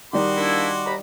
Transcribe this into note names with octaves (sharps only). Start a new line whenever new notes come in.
D#3 G3 D#4 F#4 C6 D6
A#3 D4 E4
D#2 A#5 B5